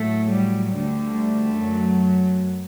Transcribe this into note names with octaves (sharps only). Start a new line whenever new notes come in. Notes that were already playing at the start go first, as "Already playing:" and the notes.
Already playing: A2 F#3 A3
G3
D2 D3 G3
A3
F#2 F#3